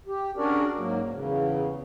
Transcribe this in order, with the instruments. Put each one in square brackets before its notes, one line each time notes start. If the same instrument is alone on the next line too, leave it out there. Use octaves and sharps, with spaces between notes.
[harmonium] G4
C#4 D4 F#4 G#4 A#4 D5
G#2 F#3 A#3
E2 C#3